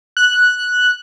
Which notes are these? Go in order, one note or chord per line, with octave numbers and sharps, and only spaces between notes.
F#6